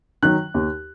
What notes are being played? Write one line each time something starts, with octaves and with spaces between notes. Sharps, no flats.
D#3 F#3 F#6
D#2